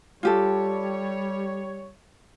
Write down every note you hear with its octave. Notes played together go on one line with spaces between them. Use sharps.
G3 F4 G4 A4 C#5